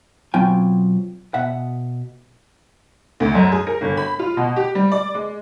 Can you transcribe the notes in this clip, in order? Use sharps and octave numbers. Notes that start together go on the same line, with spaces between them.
B2 F#3 C4 F4 G5 G#5
B2 E5 F#5
D2
F#2
G#4
A#4
G1
B5
F4
B2
G4
G3
D5
G#3